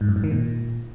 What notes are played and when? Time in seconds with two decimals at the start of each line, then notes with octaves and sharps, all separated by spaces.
0.01 G#2
0.08 F#2
0.16 G#2
0.24 D#3
0.31 A#2